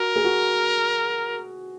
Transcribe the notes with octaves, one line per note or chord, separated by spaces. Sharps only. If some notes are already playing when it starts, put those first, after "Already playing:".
Already playing: F#4 A#4
G#4
F#4